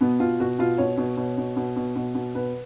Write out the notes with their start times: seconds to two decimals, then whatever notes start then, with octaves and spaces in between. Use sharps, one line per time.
0.01 B2 B3
0.20 B2 F4
0.40 B2 F#4
0.59 B2 F4
0.78 B2 C#5
0.98 B2
1.17 B2
1.38 B2
1.56 B2
1.76 B2
1.96 B2
2.15 B2
2.35 B2 B4